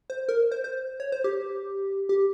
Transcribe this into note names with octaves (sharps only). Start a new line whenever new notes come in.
C5
A#4
C5
C5
C#5
C5
G4
G4